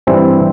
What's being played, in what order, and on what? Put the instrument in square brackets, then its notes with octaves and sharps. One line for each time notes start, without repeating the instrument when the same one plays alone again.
[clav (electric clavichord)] G2 E3 G3 C4 E4